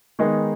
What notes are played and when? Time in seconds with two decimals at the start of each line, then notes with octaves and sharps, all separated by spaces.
0.19 D#3 G#3 B3 D#4 G#4